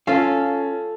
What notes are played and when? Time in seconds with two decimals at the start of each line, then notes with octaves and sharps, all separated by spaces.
0.07 C#4 F4 A4 F5